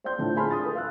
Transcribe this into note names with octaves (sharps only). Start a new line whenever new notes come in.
C5 D5 G5 C6 G6
A2 D3 F3 D4 E4
G#4 G#5 A5 B5 C6 F6
C6 D#6 A6
A4 B4
F5 E6 F#6